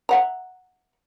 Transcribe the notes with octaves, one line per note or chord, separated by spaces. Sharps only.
E5 F#5 A#5